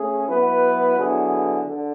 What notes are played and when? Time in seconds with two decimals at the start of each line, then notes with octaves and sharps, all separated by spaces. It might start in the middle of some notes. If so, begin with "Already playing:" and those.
Already playing: A3 C#4 G#4
0.28 F#3 B3 E4 B4
0.96 D3 F#3 B3 E4 G#4
1.64 D3